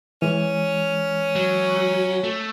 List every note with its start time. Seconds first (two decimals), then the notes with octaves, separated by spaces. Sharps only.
0.22 E3 G#3 C#4
1.36 F#3
2.24 A3